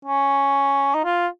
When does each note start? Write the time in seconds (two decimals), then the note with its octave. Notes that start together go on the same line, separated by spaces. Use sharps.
0.05 C#4
0.94 D#4
1.04 F4